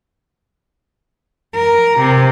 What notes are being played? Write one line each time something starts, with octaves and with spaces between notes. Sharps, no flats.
A#4
C3